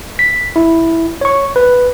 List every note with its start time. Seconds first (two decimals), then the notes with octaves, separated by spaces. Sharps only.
0.19 B6
0.56 E4
1.21 C#5 C#6
1.56 B4